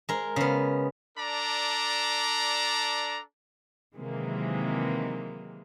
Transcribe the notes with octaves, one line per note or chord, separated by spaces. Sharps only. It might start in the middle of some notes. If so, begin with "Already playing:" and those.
G#3 A#4
C#3 B3
D4 A4 D5 A#5
C3 D#3 E3 F#3 G#3 A#3